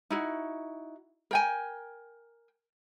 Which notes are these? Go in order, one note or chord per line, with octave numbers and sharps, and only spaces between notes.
D#4 E4 F#4
A#4 G5 G#5